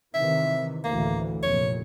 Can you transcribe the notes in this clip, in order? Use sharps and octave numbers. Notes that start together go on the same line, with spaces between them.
C3 D#3 E3 E5
A1 D2 E3 A#3
F1 A#2 C#5